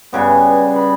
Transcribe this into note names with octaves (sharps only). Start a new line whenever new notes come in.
G2 C#3 B3
B5